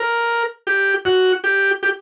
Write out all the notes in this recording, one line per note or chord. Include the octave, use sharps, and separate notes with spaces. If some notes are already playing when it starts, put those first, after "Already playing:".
Already playing: A#4
G4
F#4
G4
G4